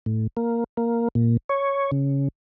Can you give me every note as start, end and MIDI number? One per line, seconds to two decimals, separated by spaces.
0.06 0.27 45
0.37 0.64 58
0.77 1.08 58
1.15 1.37 46
1.49 1.91 73
1.92 2.28 49